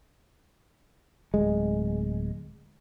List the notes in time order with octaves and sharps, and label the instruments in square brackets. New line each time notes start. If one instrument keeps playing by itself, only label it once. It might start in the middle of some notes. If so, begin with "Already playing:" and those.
[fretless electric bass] D1 G#3